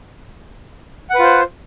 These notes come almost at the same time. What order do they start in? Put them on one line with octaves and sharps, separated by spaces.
F#5 B4 F4 C5